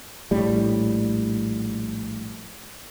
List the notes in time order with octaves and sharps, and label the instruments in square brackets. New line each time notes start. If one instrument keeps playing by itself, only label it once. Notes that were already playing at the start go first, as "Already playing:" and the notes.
[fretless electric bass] A#1 A2 G3